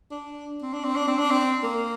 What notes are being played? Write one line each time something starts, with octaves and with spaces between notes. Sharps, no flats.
D4
C4
D4
C4
D4
C4
D4
C4
A#3